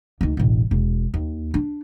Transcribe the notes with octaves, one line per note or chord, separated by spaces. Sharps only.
D2 D#3
E1 A1
E1
D#2
D4